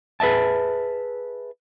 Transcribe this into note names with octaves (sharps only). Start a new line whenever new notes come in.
G#4 B4 D#5 E5 A5